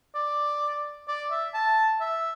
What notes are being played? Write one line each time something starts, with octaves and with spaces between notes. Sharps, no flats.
D5
D5
E5
A5
E5